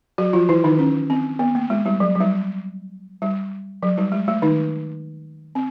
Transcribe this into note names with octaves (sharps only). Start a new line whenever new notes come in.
F#3 F#4
F3 F4
E3 E4
D#3 D#4
C#4
C4
B3
A#3
G#3
G3
F#3
F#3
G3
G3
F#3
G3
G#3
A3
D#3 D#4
C4